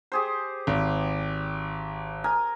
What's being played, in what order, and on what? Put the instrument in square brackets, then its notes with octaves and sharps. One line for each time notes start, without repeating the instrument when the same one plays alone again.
[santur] G4 G#4 C5
[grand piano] G#1
[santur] A#4 G#5 D#6